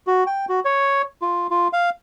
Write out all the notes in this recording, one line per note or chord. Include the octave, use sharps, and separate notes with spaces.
F#4
G5
F#4
C#5
F4
F4
F5